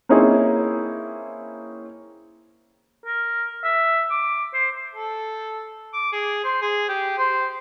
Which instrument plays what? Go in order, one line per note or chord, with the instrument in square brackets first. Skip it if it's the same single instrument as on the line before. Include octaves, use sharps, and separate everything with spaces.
[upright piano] A#3 C4 C#4 D#4 E4 G#4
[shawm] A#4
E5
D6
C5
[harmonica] A4
D6
G#4
C5
G#4
G4
C5